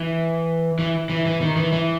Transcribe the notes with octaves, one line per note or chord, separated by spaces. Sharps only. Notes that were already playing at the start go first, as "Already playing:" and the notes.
Already playing: E3
E3
E3
E3
D#3
E3
E3